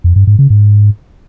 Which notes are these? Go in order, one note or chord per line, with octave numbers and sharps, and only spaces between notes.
F2
G2
G#2
C#3
G#2